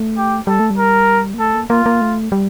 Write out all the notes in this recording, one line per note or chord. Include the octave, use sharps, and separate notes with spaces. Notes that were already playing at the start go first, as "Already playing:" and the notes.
Already playing: A3
G4
G3 A4
A3
G3
A#4
A#3
A3 A4
A#3
A#3 F4
A#3
A3
G3